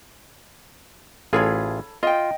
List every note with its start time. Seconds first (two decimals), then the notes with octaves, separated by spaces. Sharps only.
1.33 A1 F4 G#4 A4 C#5 B5
2.03 F4 D#5 G5